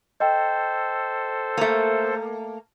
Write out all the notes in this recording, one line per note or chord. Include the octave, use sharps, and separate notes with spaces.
A4 C5 D#5 G5
A3 A#3